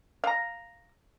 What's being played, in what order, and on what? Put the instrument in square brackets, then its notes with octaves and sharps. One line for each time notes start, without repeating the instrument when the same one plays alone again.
[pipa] F5 A#5